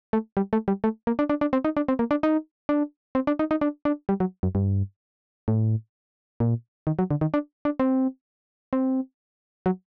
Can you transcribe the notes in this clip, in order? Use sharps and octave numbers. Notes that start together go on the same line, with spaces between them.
A3
G3
A3
G3
A3
A#3
D4
D4
D4
C4
D#4
D4
C4
A#3
D4
D#4
D4
C4
D4
D#4
D#4
D4
D4
G3
F#3
F#2
G2
A2
A#2
D#3
F#3
D3
D#3
D4
D4
C4
C4
F#3